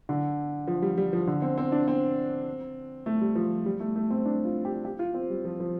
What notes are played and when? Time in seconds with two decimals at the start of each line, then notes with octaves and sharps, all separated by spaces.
0.09 D3
0.67 F3
0.82 G3
0.98 G3
1.13 F3
1.27 D3
1.42 C4
1.58 C4
1.72 D4
1.88 C4
3.06 A3
3.21 G3
3.35 F3
3.66 G3
3.80 A3
3.96 A3
4.10 C4
4.26 D4
4.45 F4
4.65 G4
4.85 G4
4.99 F4
5.14 C4
5.30 G3
5.45 F3
5.60 F3